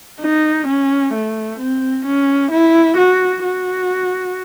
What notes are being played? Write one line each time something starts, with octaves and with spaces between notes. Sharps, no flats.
D#4
C#4
A3
C4
C#4
E4
F#4
F#4